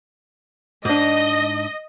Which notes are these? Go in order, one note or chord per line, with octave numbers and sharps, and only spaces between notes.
G#2 D4 D#5